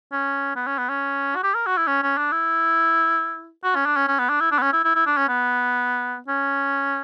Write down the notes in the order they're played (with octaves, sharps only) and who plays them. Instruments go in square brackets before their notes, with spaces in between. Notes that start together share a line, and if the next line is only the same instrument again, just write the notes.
[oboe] C#4
B3
C#4
B3
C#4
F#4
G4
A#4
F#4
E4
C#4
C#4
D4
E4
F#4
C#4
D4
C#4
C#4
B3
D4
E4
D4
B3
C#4
E4
E4
E4
D4
C#4
B3
C#4